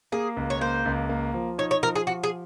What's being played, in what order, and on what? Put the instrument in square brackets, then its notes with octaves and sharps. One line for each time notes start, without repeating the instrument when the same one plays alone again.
[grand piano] A#3 [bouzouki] G#4
[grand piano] C#2
[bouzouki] C#5
[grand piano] A#3 [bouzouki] C5
[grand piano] C#2
A#3
F3
[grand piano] D#4 [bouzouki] C#5
[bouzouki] C#5
[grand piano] F3 [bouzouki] A#4
[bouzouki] G#4
[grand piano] F3 [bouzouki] F#4
[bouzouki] G#4